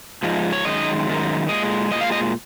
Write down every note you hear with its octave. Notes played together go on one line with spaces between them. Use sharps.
G#2 F3 G#3
C#5
F#2 D#3 G#3 D#5
F#2 D#3 G#3
A#2 G#3 D#5
A#2 G#3 D#5
F5
D#5